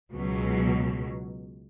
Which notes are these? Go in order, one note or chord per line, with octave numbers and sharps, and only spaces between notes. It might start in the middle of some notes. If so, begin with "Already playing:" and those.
C#2 B2 F#3